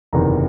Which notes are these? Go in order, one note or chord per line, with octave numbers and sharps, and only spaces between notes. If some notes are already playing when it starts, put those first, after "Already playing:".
F#1 E2 C3 D#3 A#5